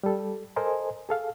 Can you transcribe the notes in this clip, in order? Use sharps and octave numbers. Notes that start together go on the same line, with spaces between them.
G3 A4
A4 A#4 C5 D#5 G#5
G#4 A4 F5